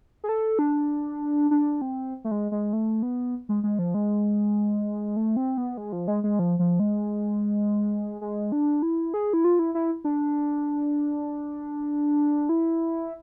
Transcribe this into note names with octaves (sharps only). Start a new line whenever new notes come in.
G#4
A4
D4
D4
C4
A3
G#3
G#3
A3
B3
G#3
G#3
F3
G#3
A3
C4
B3
G#3
F3
G#3
G#3
F3
F3
G#3
G#3
D4
E4
G#4
E4
F4
E4
E4
D4
E4